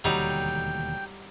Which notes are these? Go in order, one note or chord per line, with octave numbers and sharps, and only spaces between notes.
E1 D#2 D3 F#3 G3 D#4 G5